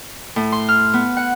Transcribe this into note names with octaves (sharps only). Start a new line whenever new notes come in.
A2
C6
F6
B3
F#5